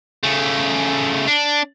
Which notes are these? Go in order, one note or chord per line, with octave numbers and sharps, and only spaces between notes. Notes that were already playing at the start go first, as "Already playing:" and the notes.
C#3 A3
D4